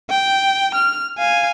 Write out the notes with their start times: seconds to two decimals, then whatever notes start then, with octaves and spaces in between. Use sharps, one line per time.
0.10 G5
0.75 F6
1.18 F5 G#5